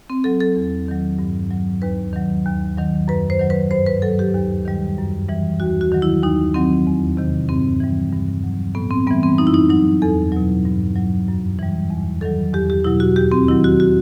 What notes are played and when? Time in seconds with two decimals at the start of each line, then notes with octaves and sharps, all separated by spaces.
0.10 C4
0.24 F#3 A4
0.40 A4
0.56 E2
0.88 D#3 F#3
1.19 G2
1.51 F#3
1.82 D#2 B4
2.13 D#3 F#3
2.45 D#2
2.77 D#3 F#3
3.08 F#2 B4
3.30 C5
3.40 D#3 F#3
3.50 B4
3.71 G2 C5
3.86 B4
4.02 F#3 A4
4.19 G4
4.35 D#2
4.65 D#3 G3
4.98 F#2
5.28 E3 G3
5.60 D#2 F#4
5.81 F#4
5.92 D#3 F#3
6.02 E4
6.23 D#2 D#4
6.54 D#3 F#3 C4
6.87 E2
7.17 C3 D#3
7.49 G2 C4
7.80 E3 G3
8.13 G2
8.44 F#3
8.75 A2 B3
8.90 C4
9.07 G3 B3
9.10 E3
9.23 C4
9.38 F#2 D#4
9.47 E4
9.54 D#4
9.69 F#3 D#4
10.02 E2 A4
10.32 B2 F#3
10.65 G2
10.96 F#3
11.28 F#2
11.59 E3 G3
11.90 E2
12.21 D#3 F#3 A4
12.53 E2 G4
12.70 G4
12.84 B2 F#3 E4
13.00 F#4
13.16 D#2 G4
13.32 C4
13.48 D#3 F#3 E4
13.64 F#4
13.80 F#4